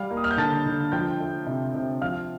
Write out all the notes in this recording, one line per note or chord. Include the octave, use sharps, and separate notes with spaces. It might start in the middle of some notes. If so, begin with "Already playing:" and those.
Already playing: G3 F5 F6
A#3
D#6
F6
G6
D3 A5 A6
D3
F3 G5 G6
A3
C3
C3
F3 F5 F6